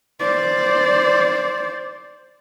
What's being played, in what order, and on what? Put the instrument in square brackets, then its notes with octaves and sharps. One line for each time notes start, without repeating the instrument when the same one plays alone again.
[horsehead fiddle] C5 D5